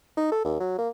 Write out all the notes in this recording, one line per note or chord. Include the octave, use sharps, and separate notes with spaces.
D#4
A4
D#2
F#3
A#3